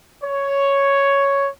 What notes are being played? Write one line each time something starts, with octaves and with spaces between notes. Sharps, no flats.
C#5